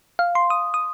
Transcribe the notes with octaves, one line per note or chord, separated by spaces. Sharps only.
F5
C6
D#6
D#6